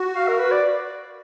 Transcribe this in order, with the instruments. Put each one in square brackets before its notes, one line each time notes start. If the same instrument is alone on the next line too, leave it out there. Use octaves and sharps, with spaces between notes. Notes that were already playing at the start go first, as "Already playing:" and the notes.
Already playing: [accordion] F#4
[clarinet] F5
A#4
B4
D5